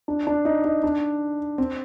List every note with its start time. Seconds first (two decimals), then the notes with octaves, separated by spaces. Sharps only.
0.08 D4
0.27 D4
0.45 D#4
0.65 D#4
0.84 D4
1.58 C4